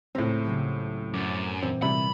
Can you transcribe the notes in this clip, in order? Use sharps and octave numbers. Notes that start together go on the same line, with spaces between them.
C#2 A2 C4 A#5 B6
C#3 F#3 G4
F#2 D6 G6 A6
A#2 E3 C4
C3 G3 E4 B5